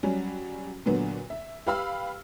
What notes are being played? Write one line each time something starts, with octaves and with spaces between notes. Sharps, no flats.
F#3 G3 C#4
A#2 D3 F#3 B3
E5
G4 B4 F5 B5 E6 F6